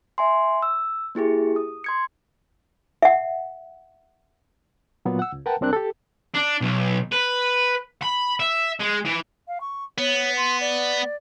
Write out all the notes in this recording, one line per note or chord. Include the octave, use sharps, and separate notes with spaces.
E5 G#5 C6
E6
A#3 E4 G4 G#4
D#6
C6 G#6 C#7
E5 F#5
A#2 F#3 A#3 B3 F4
F#5 E6
C#2
A#4 B4 F#5 G5 A5
C2 C3 C4 D4 A#4 F#6
G4 A4
D4
B1
B4
B5
E5
G#3
E3
F5
C#6
B3 C#5
C6
D5